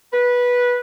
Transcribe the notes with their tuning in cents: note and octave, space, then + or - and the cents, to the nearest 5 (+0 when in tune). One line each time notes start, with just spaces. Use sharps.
B4 -15